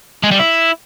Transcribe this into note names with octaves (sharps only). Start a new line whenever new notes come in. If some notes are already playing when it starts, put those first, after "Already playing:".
G#3
G3
E4